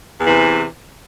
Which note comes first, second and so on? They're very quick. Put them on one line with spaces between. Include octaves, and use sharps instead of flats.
E2 E3 C3